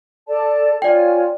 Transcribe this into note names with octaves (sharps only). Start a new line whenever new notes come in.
A4 D5 A5
F4 C#5 D5 G5 G#5